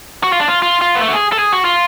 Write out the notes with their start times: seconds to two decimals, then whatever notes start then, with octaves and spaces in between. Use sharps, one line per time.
0.23 F#4
0.32 F4
0.40 D4
0.48 F4
0.62 F4
0.81 F4
0.95 B3
1.01 A3
1.08 F#4
1.13 G#4
1.32 A4
1.39 G#4
1.53 F#4
1.65 F4